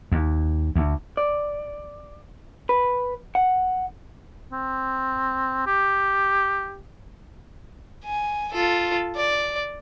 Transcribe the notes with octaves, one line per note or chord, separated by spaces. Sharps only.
D#2
D2
D5
B4
F#5
C4
G4
G#5
F4 A4
D5